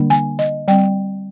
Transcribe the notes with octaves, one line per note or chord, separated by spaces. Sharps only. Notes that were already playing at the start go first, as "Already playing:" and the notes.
Already playing: D3 G3 A#3 D4
G#5
D#5
G3 C4 G5